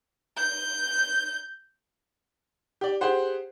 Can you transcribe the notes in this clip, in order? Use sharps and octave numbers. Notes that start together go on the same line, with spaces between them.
G6
G4 D5
G4 G#4 C5 F#5